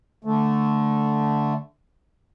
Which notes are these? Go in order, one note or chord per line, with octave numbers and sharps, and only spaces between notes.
D3 A3